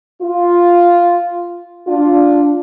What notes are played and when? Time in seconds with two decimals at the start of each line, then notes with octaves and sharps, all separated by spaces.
0.22 F4
1.88 D4 F4